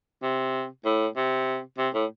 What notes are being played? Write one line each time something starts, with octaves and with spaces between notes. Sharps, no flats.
C3
A2
C3
C3
A2